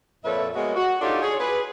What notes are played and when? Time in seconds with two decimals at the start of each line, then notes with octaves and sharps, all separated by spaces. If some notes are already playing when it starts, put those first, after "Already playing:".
0.24 F2 A#2 A4 B4 C#5 E5
0.55 G#3 A#3 B3 F#4 C#5
0.76 F#4
1.01 D4 D#4 F4 G4 A4 C#5
1.22 G#4 C#5
1.40 G#4 B4